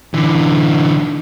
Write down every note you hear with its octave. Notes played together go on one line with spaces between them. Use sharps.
D3 E3